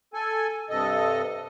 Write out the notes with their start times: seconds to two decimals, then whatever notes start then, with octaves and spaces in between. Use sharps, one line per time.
0.14 A4 G#5
0.69 G2 C3 A4 D#5